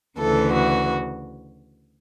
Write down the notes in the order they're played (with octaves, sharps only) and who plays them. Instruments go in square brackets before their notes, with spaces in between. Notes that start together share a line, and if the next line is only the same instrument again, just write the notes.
[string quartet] D2 C#3 E3 A4
F#4